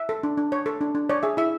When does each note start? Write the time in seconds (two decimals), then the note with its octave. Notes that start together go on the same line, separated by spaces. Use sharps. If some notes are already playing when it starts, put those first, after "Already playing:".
Already playing: E5
0.09 A4
0.23 D4
0.38 D4
0.52 C#5
0.66 A4
0.81 D4
0.95 D4
1.10 C#5 D5
1.23 G#4 E5
1.37 E4 E5